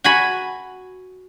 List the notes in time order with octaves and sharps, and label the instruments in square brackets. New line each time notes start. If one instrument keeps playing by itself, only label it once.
[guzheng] F#4 G#5 B5